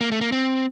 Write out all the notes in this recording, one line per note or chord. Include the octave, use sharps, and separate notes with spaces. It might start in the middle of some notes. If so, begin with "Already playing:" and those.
A#3
A3
A#3
C4